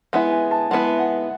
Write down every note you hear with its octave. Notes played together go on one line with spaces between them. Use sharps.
G#3 B3 E4 F#5
G#5
A5
G#3 B3 E4 F#5
F#5